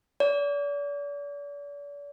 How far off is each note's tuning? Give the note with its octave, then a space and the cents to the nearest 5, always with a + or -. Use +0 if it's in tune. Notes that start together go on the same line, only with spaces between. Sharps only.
D5 -40